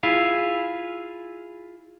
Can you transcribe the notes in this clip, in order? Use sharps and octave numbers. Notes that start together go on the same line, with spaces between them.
E4 F4 G#4 F5